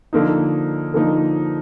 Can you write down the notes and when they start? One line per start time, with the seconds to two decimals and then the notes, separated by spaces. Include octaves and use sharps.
0.13 D3 F3 A#3 D#4
0.94 D3 F3 A#3 D#4